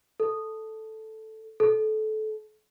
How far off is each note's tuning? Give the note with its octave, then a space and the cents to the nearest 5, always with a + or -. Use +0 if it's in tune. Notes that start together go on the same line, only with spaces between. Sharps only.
A4 +0
A4 -25